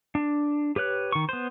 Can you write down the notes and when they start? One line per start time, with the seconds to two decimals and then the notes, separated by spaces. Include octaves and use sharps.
0.15 D4
0.76 G4 B4 C#5 F#6
1.12 D#3 C#6
1.29 B3 C5